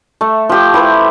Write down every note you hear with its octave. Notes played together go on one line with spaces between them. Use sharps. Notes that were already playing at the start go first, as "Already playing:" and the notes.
A3
F3 G4
E4 G4 B4 C5